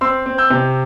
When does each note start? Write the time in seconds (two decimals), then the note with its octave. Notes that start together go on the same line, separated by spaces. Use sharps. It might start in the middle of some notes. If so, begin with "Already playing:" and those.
0.01 C4 C6 E6
0.26 C4
0.38 E6 G6
0.50 C3